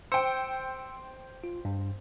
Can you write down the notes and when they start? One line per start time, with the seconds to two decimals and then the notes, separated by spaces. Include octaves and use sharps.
0.12 C5 G5 E6 C#7
1.44 F4
1.65 G2